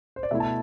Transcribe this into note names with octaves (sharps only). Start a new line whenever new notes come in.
C5
D5
B2 A3 E4 E5
A5